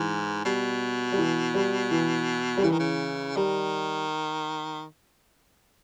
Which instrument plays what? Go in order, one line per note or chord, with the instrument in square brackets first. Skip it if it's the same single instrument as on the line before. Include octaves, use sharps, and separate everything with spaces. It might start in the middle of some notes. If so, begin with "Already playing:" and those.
Already playing: [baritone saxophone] G#2 [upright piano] E3
[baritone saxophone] B2 [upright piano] G3
[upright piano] G3
E3
G3
E3
G3
[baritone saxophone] C#3 [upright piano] E3
[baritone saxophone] D#3
C#3
[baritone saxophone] D#3 [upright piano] G3